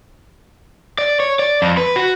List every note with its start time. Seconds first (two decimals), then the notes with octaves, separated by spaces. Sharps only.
0.98 D5
1.20 C#5
1.39 D5
1.62 F2
1.77 B4
1.96 F#4